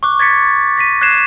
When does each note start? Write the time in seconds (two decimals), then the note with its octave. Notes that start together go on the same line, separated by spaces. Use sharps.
0.03 C#6 D6 F#6
0.20 G#6 A6 B6 C#7
0.78 A#6 B6 D#7
1.01 F#6 G#6 C7 E7